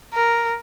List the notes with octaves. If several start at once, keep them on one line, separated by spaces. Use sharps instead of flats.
A#4